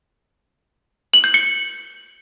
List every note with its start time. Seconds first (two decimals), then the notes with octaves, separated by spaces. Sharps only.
1.14 F#7
1.24 G6
1.34 C#7